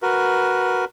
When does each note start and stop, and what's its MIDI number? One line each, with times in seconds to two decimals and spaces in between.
0.02 0.85 66
0.02 0.85 70
0.02 0.85 71